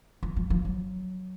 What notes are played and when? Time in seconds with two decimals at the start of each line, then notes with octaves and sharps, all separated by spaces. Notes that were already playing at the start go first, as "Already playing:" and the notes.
0.23 F3
0.37 F3
0.50 F3
0.65 F#3